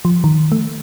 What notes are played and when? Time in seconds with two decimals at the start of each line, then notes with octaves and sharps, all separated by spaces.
0.05 F3
0.24 D#3
0.52 A3